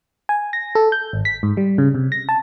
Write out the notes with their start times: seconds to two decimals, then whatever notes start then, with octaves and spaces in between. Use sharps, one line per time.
0.29 G#5
0.53 A#6
0.75 A4
0.92 G6
1.13 G#1
1.25 B6
1.43 G#2
1.57 G3
1.78 C#3
1.95 C3
2.12 A#6
2.29 A5